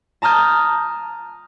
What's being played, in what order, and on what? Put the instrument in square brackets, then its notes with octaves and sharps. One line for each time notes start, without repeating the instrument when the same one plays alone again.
[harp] A5 A#5 D#6 F6 G6